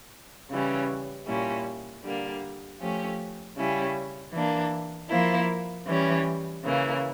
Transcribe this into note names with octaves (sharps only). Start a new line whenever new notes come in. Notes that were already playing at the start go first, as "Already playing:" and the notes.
C#3 E3 G3 C#4
A#2 G3 C#4 E4
D3 G3 A#3
F3 A3 C#4 G4
C#3 G3 C#4 E4
E3 A#3 D4
F3 A#3 E4
E3 G3 C#4
C#3 E3 A#3